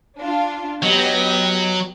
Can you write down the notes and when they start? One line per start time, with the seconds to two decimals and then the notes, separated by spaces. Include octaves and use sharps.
0.20 D4 F4
0.83 F#3 B3 G4 D#5